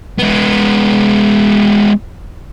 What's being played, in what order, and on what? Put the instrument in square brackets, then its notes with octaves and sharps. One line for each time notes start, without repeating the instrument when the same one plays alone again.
[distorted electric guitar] G#3 B3